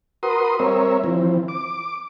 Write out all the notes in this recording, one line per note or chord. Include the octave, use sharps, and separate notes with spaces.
F#4 A#4 B4 C6 D#6
G3 C4 A#4 C#5 E5
E3 F3 C4
D6